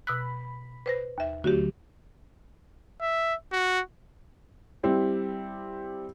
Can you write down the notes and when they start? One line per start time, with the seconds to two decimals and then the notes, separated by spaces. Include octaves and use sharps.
0.07 B2 B5 E6 F#6
0.86 B4 C5 A#6
1.18 D#2 E5
1.44 D2 F#3 F#4 G4
3.01 E5
3.52 F#4
4.83 G3 C4 E4 G4